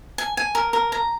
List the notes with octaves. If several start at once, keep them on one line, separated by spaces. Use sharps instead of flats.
G#5
G#5
A#4
A#4
A#5